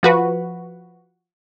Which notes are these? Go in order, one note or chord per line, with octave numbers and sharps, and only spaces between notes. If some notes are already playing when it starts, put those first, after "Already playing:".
F3 F#4 B4